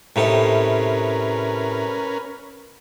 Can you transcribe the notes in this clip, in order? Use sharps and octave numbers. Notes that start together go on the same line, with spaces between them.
A2 C3 C#4 D#4 A#4 B4